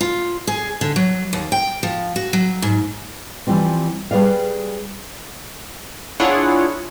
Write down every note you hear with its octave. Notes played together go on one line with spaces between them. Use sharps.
F4
G#4
D3
F#3
D#2
G5
F3
F#4
F#3
G#2
E3 F3 G3 C4
G3 G#4 B4 D5 F5
D4 E4 F4 G#4 C#5 F#5